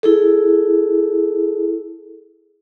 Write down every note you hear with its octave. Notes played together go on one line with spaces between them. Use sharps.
E4 G#4 A4